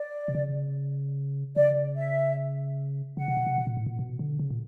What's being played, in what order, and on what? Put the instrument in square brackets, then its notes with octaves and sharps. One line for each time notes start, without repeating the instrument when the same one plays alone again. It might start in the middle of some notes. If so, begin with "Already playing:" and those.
Already playing: [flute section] D5
[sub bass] C3
C#3
[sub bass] C#3 [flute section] D5
[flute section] E5
[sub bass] C#3 [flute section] F#5
[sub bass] C3
B2
C3
B2
A#2
A2
A#2
B2
D3
C#3
A#2